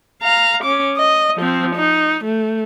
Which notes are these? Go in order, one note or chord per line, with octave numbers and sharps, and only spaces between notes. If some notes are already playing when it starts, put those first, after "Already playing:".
F5 A#5
C#4 D6
D#5
F3 C4
D#4
A3